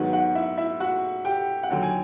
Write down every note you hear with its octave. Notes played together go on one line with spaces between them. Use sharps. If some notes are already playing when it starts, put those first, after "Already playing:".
Already playing: G#2 D#3 F#3 B3 F#4 F#5
F#4 F#5
E4 E5
E4 E5
F#4 F#5
G4 G5
F#5
D#2 D3 F#3 G5
G#5